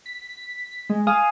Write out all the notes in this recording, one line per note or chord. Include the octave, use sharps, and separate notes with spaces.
B6
G#3
F5 G#5 D#6